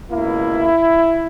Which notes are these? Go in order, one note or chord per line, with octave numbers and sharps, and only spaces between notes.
C#2 B2 A#3 E4